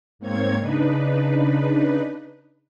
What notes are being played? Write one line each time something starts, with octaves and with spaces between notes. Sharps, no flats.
G#2 A#3 C4 C#5 G#6
C#3 D4 D#4 B4